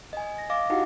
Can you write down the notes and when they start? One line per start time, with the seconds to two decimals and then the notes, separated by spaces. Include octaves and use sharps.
0.13 D#5 G#5
0.38 A#6
0.50 D#5 F5 D6 A#6
0.70 D#4 E4 F#4 G4 F5 F#5